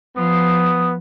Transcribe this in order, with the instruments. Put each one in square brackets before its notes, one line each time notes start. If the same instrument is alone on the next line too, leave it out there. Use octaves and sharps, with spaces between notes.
[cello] F3 [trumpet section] B3 D#6